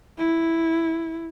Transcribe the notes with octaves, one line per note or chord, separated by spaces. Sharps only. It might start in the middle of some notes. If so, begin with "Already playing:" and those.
E4